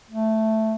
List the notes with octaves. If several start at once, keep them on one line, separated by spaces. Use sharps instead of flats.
A3